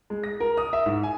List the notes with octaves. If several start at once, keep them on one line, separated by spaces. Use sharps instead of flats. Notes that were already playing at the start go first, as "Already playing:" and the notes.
G#3
A#6
A#4
D#6
E5
G#2
G#5